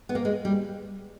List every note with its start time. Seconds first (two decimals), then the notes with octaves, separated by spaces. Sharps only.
0.09 B3
0.15 A#3
0.25 G#3
0.45 G3